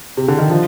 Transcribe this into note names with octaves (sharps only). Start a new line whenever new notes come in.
C3
D3
D#3
F3